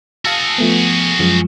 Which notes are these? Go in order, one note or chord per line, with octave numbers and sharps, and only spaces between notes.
F#4 G#4 F5 A5 E6
F3 A3 B3
F#2 F3 G#3